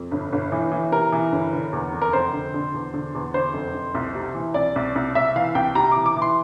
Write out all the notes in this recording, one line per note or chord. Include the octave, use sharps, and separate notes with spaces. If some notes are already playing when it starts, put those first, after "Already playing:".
Already playing: F2
G1
G1
E3
E3
C3 A#4
E3
G1
D3
E2
F1
A#4
F1 C5
D3
D3
E2
D3
E2
D3 C5
F1
F1
C2
C3
E3
C2 D5
C2
C2
C2 E5
E3 F5
C2 G5
C3 A#5
E3 D6
D6
E3
C6